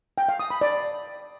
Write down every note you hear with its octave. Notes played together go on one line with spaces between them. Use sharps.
G5
F5
D#6
B5
D5